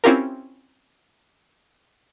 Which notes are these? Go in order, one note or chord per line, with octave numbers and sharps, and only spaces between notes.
C4 C#4 E4 F4 G4 A#4